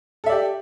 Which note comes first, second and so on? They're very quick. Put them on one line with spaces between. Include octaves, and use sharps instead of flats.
A4 E5 D5 G4